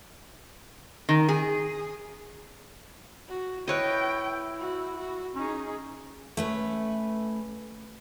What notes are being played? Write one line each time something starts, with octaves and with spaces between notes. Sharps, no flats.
D#3
G#4
F#4
E4 B4 C#5 D#5 G5
F#4
F#4
C#4 D#4 G#4
A3 C#4 B4